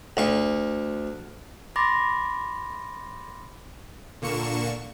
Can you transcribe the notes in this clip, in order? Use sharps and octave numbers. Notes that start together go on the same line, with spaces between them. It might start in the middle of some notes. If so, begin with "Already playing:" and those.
D2 C#6
B5 C6 D6 A6 A#6
A#2 D3 A#3 C#6 C#7 E7